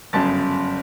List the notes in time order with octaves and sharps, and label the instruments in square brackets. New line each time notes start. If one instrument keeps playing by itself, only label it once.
[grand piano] G1 F#2 C#3 A5 A6